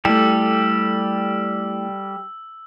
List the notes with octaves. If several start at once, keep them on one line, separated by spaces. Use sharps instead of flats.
G3 A3 E4 G4 A4 E6